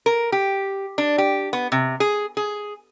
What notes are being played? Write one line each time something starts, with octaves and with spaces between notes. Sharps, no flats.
A#4
G4
D4
G4
B3
C3
G#4
G#4